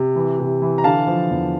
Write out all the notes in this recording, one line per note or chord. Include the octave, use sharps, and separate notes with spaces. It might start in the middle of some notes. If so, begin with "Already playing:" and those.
Already playing: C3
E3
C3
E3
A#5
D3 F5 A5
F3
E2